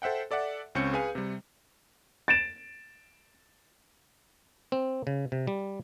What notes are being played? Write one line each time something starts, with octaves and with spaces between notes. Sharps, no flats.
A4 C5 E5 F#5 G5
A4 D5 E5 F#5
C#2 C4 C#4 C#6 G6 C#7
G#4 B4 F5 G#5
C3 G3
A6 D7 E7
C4
C#3
C3
G3